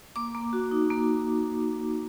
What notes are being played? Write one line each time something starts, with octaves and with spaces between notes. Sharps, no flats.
A#3 D6
A#3
F#4
D#4
A#3